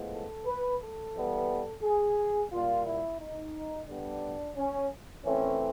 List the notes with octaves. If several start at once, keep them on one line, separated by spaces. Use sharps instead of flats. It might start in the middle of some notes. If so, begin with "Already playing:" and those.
Already playing: A2 F3 G#3 B3
A4
B4
A4
E3 G3 B3
G#4
A#2 G3 A#3 F4
E4
D#4
D3 G3 B3 D4
C#4
E3 A3 C4 C#4